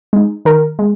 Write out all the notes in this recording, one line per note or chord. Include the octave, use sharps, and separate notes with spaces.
G#3 D#4
D#3 A#4
G#3